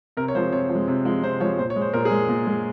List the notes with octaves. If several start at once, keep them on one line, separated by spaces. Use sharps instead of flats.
C3 A#4
C#5
F3 G#3 C5
C3 C#5
F3
G#3
C3
F3 G#3
C3 C5
F3 G#3 C#5
A#2 C5
C#5
G#3
C5
A#2 A#4
G#4
G#3
A#2
G#3